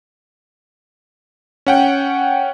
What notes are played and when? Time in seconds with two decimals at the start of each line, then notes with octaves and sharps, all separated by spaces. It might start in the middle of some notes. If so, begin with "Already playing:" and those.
1.67 C#4 F#5 G5